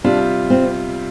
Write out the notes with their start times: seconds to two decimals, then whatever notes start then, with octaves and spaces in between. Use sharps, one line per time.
0.04 C3 G3 D4 F4
0.50 C4